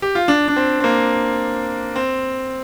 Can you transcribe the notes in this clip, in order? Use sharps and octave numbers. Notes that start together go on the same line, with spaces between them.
G4
F4
D4
D4
C4
C4
A#3
C4